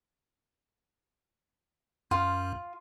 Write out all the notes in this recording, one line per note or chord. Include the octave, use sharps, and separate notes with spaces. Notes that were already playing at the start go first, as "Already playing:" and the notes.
F#2 F4